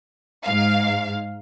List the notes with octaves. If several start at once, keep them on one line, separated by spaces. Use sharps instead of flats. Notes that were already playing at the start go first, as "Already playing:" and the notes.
G#2 F5